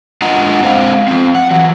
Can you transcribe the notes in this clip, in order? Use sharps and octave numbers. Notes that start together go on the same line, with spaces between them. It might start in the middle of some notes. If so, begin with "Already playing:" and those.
G#3 D4 F4 D#5 F#5 A#5
G#3 C4 C5 F5
F3 C4
F#5
E3 F#3